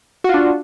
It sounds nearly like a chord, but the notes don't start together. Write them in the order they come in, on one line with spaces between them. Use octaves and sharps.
F#4 F4 D4